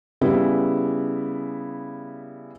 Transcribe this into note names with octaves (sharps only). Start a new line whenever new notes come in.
C#3 G3 B3 E4 G#4